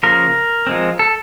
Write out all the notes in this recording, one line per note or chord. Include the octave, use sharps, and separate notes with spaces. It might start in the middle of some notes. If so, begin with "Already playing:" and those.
C#3 F3 A#3 A#4
F3 G#3 C4
A4